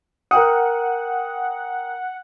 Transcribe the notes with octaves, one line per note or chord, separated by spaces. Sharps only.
A#4 F#5 G5 D#6